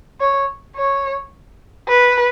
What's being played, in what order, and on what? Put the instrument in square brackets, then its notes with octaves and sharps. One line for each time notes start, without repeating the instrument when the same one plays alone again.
[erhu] C#5
C#5
B4